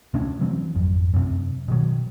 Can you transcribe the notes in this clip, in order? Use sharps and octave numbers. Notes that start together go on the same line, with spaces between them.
C3 A3 C#4 D4
E3 F#3 C4
G#1 F2
F#2 C3
B2 D#3 F#3